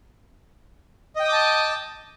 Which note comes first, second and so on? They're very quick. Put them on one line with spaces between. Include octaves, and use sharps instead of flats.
D#5 G5 D#6 D6 A5